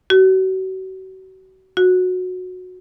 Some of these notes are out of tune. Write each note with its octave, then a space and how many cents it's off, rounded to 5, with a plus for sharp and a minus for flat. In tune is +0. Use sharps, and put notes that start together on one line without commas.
F#4 +35
F#4 -15